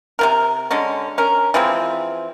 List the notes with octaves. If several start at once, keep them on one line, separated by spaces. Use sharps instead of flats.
C3 F3 A#4
D3 G#3 C#4
C#4 A#4
E3 F3 G#3 C4